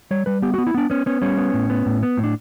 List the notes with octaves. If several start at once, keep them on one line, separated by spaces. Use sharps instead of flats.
G3 C#5
G3 B4
B3 G4
F#4
B3
E4
B3 D4
B3 C#4
B3 C#4
G3 C#4
B3
A2
B3
A2
B3
A2
D4